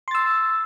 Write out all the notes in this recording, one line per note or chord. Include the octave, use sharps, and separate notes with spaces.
C6 E6 A6